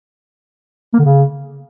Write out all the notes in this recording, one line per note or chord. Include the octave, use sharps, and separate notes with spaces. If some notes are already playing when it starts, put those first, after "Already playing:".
A#3
D3
C#3